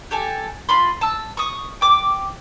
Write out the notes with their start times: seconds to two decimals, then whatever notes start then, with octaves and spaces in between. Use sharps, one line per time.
0.11 G4 A4 G#5
0.69 F4 B5 C6
1.01 A5 E6
1.37 C#6 D#6
1.81 G5 D6